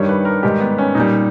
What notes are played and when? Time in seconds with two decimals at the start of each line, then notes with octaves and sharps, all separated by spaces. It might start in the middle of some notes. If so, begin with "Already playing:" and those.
Already playing: G2 D#3 G3 C#5
0.09 B4
0.25 A#4
0.43 G#2 D#3 G3 G4
0.60 B3
0.78 C#4
0.95 A#2 G3 D#4